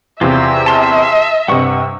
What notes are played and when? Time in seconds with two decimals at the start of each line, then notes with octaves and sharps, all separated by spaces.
0.21 E2 C3 F4 C5 E5
0.66 A5 C6 F6
1.48 G2 C3 F#5 C#6